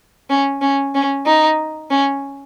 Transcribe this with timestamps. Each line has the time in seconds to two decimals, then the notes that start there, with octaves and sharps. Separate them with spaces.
0.30 C#4
0.62 C#4
0.95 C#4
1.26 D#4
1.90 C#4